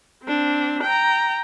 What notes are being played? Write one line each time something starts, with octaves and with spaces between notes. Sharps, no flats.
C4 D4
G5 A#5